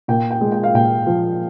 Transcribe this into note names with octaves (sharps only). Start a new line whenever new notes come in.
A#2 G5
G5
G#3
G5
F5
A#2 G5
F3